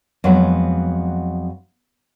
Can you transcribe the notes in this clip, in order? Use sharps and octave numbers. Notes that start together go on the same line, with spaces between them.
F2 F#3 G#3 B3 F#5